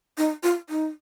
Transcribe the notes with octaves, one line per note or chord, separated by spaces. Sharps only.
D#4
F4
D#4